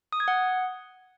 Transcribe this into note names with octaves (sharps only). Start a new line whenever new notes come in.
D#6
G#6
F#5